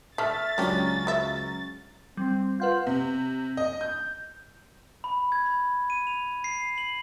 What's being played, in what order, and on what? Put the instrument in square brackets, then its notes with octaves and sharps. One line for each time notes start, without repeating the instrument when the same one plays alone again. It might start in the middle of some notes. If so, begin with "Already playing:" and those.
[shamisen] A3 [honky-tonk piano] E5 F6 B6 [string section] A6
[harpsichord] C#2 B5 [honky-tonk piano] F#3 C#4 [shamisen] D4 G4
[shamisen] C#3 E5
[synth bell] G3 [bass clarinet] C4
[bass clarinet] F4 [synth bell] B4 F#5 G6
[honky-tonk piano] C3
D#5
G6
[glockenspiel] B5
G#6
B5
D#7
F7
C7
F#7